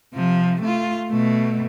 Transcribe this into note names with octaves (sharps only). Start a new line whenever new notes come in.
C3 F3
A3 F4
B2 A3